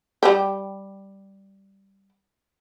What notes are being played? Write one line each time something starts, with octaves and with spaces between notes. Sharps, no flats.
G3 G4